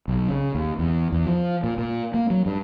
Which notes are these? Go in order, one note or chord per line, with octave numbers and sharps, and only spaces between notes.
B1
C#3
D#2
E2
E2
F3
A#2
A#2
A#3
F#3
G2